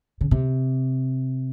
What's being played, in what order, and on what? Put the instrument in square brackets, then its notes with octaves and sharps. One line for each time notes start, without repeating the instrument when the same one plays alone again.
[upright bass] C#3
C3